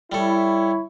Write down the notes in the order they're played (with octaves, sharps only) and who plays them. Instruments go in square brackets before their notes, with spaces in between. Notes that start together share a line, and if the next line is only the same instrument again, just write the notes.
[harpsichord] G3 A4 [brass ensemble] E4 C#5